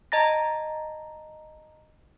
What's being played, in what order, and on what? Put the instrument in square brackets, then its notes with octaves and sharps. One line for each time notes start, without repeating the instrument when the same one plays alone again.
[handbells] D#5 A5 A#5 A6 A#6